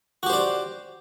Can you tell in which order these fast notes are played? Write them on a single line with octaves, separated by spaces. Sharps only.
F#4 G4 C5 D5